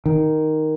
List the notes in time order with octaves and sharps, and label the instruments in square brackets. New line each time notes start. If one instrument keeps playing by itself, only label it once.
[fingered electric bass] D#3